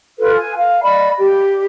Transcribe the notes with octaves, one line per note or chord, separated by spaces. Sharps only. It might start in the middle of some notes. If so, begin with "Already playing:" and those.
F4 A4 B4
G#5
F5
D5 D#5 B5
G4